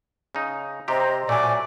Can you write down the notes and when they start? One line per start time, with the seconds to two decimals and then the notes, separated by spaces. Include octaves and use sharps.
0.35 C#3 D#4
0.88 C3 C4 G4 C5 D#5 A#5
1.29 A#2 F#3 A3 D5 G#5